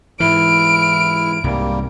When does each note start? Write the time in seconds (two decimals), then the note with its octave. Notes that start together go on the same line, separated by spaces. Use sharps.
0.20 G#2 E3 E4 F6 D7
1.44 C2 G#2 G3 A#3